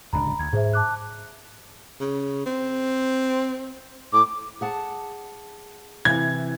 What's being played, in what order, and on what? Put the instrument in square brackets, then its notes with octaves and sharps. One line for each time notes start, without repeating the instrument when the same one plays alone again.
[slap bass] D1 C#2 D4 [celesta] A#5 B5
[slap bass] D2 [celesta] G#6
[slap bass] G#2 [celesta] G#4 C5 E5
[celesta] A5 D6 F#6
[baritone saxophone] C#3
C4
[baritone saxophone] A2 [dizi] D6
[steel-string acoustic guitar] G#4 F#5 A5
[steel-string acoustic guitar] C3 E3 [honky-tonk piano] G#6